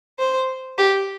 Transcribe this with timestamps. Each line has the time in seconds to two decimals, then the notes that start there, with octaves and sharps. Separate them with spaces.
0.19 C5
0.78 G4